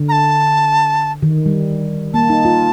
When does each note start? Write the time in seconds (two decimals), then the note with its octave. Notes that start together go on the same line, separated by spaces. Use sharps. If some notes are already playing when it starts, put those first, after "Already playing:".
Already playing: D3
0.09 A#5
0.12 A5
1.22 D#3
1.46 G3
2.14 A#3 A5
2.30 D#4
2.45 F4